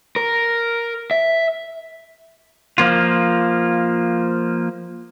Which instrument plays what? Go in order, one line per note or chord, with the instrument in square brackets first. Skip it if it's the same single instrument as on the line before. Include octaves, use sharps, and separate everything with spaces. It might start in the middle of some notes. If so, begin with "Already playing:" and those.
[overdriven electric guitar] A#4
E5
[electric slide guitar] F3 A#3 F4